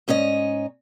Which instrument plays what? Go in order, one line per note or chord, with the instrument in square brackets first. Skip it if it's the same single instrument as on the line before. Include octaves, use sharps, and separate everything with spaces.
[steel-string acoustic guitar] G#2 C#4 C#5 D#5